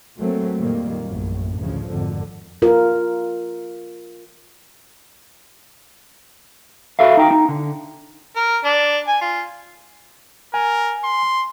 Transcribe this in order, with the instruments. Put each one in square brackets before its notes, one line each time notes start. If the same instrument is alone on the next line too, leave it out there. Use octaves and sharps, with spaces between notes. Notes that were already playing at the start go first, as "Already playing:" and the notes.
[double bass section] F#3 A3 A#3 C4
F2 A#2 D#3 G3 A#3
A#1 F#2 A2
A1 D2 C#3 F3
G#1 F2 D3
[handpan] F4 A#4
[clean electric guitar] F#4 A4 E5 F5
D#4 G5
D#4
D3
[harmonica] A#4
D4
G#5
F4
[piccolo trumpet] A#4 [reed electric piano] G#5
[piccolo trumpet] C6